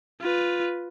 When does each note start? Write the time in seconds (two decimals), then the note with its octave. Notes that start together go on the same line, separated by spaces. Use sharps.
0.21 F4 B4